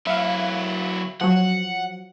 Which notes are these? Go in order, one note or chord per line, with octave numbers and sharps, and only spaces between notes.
F#3 E4 E5 F5
F3 F#3 F#5